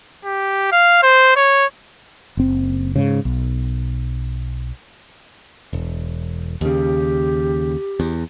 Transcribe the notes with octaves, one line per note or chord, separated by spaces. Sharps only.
G4
F5
C5
C#5
F#1 C4
G#2 C#3
B1
E1
D#2 C#3 G4
E2